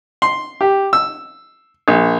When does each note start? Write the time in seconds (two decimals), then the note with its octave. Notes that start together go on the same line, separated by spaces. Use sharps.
0.22 C6
0.61 G4
0.93 E6
1.88 A#1